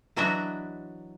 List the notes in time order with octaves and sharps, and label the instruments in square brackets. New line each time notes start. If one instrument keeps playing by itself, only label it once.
[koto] E3 F#3 D4 F#4 D#5 E5